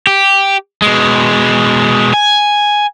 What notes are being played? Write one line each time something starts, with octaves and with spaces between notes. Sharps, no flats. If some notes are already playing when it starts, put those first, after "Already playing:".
G4
B2 G#3
G#5